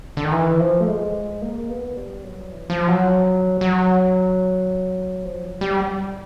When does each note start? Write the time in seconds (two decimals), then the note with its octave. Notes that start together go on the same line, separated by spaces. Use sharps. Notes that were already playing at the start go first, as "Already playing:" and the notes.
0.17 D3
0.25 D#3
0.32 E3
0.60 F3
0.80 A3
0.87 G#3
1.42 A#3
1.69 B3
1.96 G3
2.23 F#3
2.51 E3
2.70 F3
2.88 F#3
3.61 F#3
5.25 F3
5.44 F#3
5.61 G3